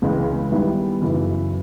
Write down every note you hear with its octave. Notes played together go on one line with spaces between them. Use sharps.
C#2 C#3 E3 G#3
D#3 G3 B3 E4
F#2 C#3 E3